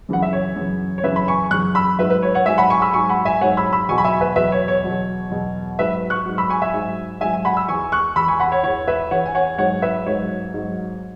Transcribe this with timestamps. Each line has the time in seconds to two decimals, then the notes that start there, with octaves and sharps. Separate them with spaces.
0.09 F#2 C#3 E3 F#5
0.22 E5
0.33 C#5
0.56 F#2 C#3 E3
0.98 C#5
1.04 F#2 C#3 E3 B4 E5
1.16 B5
1.28 G#5 C#6
1.51 F#2 C#3 E3 C#6 F#6
1.75 B5 E6
1.99 G#2 F#3 B4 E5
2.10 B4
2.23 C#5
2.34 C#5 F#5
2.46 G#2 F#3 E5 G#5
2.58 F#5 B5
2.70 G#5 C#6
2.82 B5 E6
2.93 G#2 F#3 G#5 C#6
3.09 F#5 B5
3.25 E5 G#5
3.41 G#2 F#3 C#5 F#5
3.57 B5 E6
3.73 B5 E6
3.89 E2 B2 F#3 G#5 C#6
3.98 B5
4.05 E5 G#5
4.21 B4 E5
4.36 E2 B2 F#3 B4 E5
4.52 C#5
4.68 C#5
4.84 E2 B2 F#3
5.31 E2 B2 F#3
5.79 G#2 F#3 B4 E5
6.10 C#6 F#6
6.26 G#2 F#3
6.38 B5 E6
6.50 G#5 C#6
6.62 E5 G#5
6.74 G#2 F#3
7.21 G#2 E5 G#5
7.25 F#3
7.34 G#5
7.45 F#5 B5
7.57 E6
7.68 E2 E3 G#5 C#6
7.92 C#6 F#6
8.16 E2 E3 B5 E6
8.28 G#5 C#6
8.40 F#5 B5
8.52 C#5 F#5
8.63 E2 E3 C#5 F#5
8.88 B4 E5
9.11 E2 E3 C#5 F#5
9.26 G#5
9.35 C#5 F#5
9.58 G#2 F#3 C#5 F#5
9.82 B4 E5
10.06 G#2 F#3 C#5
10.54 G#2 F#3